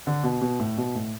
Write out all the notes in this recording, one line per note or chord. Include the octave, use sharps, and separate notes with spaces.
D3
B2
B2
A2
B2
A2